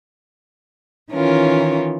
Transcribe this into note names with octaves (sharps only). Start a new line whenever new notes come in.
D#3 E3 C#4 F4 A#4 C#5